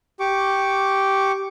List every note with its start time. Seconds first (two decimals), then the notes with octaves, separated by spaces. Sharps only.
0.20 G4 C#6 D6